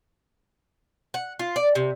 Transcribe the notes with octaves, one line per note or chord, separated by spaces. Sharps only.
F#5
F4
D5
C3